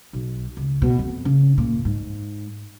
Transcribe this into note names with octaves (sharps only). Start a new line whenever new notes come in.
B1
C#2
B2
F2
C#3
A#2
G#2